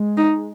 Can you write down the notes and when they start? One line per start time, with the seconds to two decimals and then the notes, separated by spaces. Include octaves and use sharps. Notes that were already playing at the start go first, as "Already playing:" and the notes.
Already playing: G#3
0.17 D#4